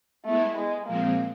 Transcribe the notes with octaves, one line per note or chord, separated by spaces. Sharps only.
G#3 A3 B3 E4
G#3
A#2 F3 G#3 A#3 C4